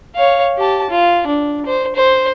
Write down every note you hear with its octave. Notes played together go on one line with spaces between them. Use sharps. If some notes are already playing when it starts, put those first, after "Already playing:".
C#5 F5
G4 A5
F4
D4
C5
C5